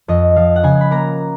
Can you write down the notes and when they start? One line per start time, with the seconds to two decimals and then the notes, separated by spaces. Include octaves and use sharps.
0.08 F2 D#5
0.36 F3 F5
0.56 F#5
0.63 C#3 G#5
0.81 B5
0.91 A#3 A#5